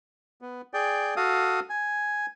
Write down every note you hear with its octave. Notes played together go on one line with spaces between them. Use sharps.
B3
G#4 D5 G5
F#4 A4 F5 D#6
G#5